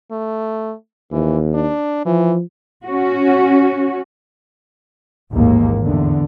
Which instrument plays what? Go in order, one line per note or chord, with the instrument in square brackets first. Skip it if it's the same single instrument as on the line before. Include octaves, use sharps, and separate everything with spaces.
[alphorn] A3
[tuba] D#2 [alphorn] E3
[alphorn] D4
[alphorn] E3 [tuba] F3
[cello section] C#4 F#4
[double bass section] A1 D#2 G#2 A#3
E2 D3